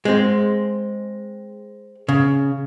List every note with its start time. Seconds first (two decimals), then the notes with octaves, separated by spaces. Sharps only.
0.05 G#3 C4
2.09 C#3